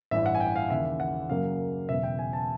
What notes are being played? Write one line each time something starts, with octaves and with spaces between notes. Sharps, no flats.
A1 G2 E3 E5
F#5
G#5
G5
F5
D#2 C#3 E3 E5
F#5
F#2 C#3 F#3 A#3 F5
E1 E2 C#3 F#3 B3 E5
G5
G#5
A5